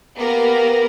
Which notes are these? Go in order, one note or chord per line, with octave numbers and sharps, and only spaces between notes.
A#3 B3 G4 A#4